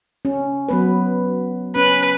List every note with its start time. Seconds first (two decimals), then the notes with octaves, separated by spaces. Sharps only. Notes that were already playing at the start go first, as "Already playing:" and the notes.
0.25 C#4
0.69 F#3 B3 B4
1.76 C#4 B4